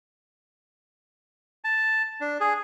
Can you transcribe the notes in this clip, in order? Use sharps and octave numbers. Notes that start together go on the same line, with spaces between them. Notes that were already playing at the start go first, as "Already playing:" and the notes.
A5
D4
G#4